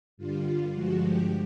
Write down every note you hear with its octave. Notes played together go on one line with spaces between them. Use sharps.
G2 D3 G3 F4
G2 D3 F3 G#3 F#4
G4